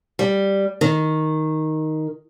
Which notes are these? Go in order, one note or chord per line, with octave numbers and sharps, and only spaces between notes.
G3
D#3